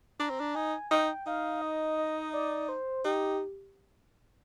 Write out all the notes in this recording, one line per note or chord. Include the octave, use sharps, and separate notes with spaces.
D4 A#5
C4
D4
D#4 G#5
D#4 G5
D#4 F5
D#5
D#5
D5
C5
D#4 G4